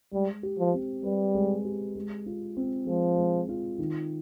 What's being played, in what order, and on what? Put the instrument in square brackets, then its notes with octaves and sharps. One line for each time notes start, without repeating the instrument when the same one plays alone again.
[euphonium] G3 [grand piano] G#3
[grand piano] G4
[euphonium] F3
[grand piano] C4
[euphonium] G3 [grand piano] B4
[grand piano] G#3
G4
G#3
F4
C4
[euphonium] F3 [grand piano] G#3
[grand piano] G#3
F4
D#3